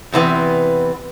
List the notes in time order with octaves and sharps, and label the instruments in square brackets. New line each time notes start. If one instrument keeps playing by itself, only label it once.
[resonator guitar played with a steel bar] E2 C3 E3 B3